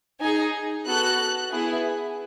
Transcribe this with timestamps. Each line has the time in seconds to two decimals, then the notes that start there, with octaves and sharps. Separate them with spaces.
0.20 D#4 G#4 G#5
0.86 B3 F#4 A4 F#6
1.51 B3 E4 G#4